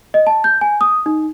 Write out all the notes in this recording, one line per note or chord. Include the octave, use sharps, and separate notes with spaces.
D#5
A5
G6
G#5
D#6
D#4